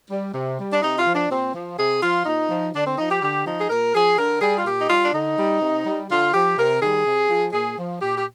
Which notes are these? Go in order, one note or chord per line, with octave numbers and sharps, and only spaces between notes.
G3
C3
G3
D4
C3 D#4
F4
F3
D4
A#2 C4
F3
C3 G#4
F3 F4
A#2 D#4
F3
D3 D4
C4
F3 D#4
G4
D3 G4
F3 D#4
G#4
A#2 A#4
F3 G#4
D3 A#4
G3 G#4
F4
A#2 G4
D#4
G3 F4
D4
D3 D#4
G3
C3
G3
D3 F4
F3 G4
C3 A#4
D#3 G3 G#4
C3
F3
A#2 G#4
F3
A#2 G4
G4